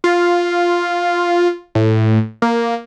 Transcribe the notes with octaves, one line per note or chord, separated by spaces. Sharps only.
F4
A2
A#3